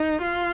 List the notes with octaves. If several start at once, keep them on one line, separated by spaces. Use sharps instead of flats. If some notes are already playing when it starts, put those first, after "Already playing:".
Already playing: D#4
F4